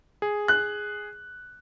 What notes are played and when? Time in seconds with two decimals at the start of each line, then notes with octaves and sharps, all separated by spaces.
0.22 G#4
0.48 F#6